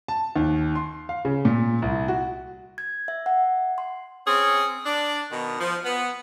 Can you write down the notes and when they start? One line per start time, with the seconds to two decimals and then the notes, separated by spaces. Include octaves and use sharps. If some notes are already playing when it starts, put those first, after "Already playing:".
0.08 A5
0.36 D#2
0.75 C6
1.09 F5
1.25 C#3
1.45 A#2
1.82 C2
2.08 F#4
2.78 G#6
3.08 E5
3.26 F#5
3.78 C6
4.27 C4 C#4 G#4
4.86 D4
5.31 B2 D#3
5.60 F3
5.85 B3